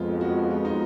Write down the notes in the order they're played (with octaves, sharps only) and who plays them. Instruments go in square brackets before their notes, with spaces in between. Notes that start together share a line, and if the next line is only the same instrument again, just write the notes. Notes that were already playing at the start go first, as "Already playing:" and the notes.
Already playing: [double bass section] F2 F3 G#3 B3 [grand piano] F4
[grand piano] F#4
F4
D#4